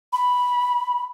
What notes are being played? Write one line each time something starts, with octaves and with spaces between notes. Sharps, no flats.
B5